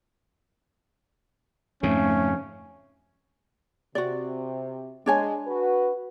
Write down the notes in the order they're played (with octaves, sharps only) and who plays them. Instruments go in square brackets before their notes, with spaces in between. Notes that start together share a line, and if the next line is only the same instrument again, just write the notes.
[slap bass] F2 G#2 C#3 [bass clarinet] A3 [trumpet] C#4
[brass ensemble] C3 [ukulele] F#4 D5
[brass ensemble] G#3 [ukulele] D4 C#5 G#5
[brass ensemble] F#4 B4